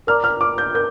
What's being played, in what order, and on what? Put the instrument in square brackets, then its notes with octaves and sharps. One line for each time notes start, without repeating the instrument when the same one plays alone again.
[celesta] A#4 D5 A#5 D6 [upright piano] F6
[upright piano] F6
D6
G6
[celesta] A#4 [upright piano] G6